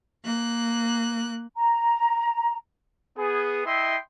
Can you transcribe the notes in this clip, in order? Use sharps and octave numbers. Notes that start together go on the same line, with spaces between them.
A#3 F#6
A#5
B3 G#4
E4 D#5 E5 G5 C6